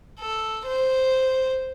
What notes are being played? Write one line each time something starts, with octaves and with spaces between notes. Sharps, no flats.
A4
C5